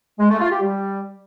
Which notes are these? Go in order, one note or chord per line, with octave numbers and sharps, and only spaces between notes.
G#3
A3
F4
G4
G3